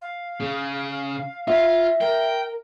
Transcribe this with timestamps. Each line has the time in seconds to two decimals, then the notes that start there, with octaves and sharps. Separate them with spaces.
0.02 F5
0.40 C#3
1.48 F4 E5
2.01 A#4 G5